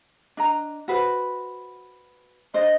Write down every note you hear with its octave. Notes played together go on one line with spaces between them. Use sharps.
D4 D#5 A#5
F#4 B4 C5
D4 C5 D#5